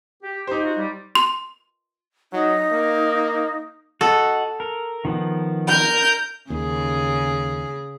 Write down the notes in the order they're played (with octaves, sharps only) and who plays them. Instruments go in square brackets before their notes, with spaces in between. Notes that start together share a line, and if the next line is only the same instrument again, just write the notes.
[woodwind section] G4
[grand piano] D#4 C5 [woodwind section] G4
[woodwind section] F4 F#4
G3
[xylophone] C6
[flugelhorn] F#3 [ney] D#4
[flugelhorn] A#3
[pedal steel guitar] F#4 D#5 F#5 [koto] A4
[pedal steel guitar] A#4
D#3 F3 B3
[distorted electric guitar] A#4 [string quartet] G6
[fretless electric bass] D#2 [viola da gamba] C#3 G#4